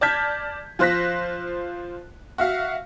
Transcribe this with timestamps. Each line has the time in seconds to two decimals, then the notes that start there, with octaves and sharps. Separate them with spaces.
0.01 D5 A5 F6 G6 G#6 B6
0.79 F3 F4 C5 F#6 A#6 B6
2.38 F#4 E5 F5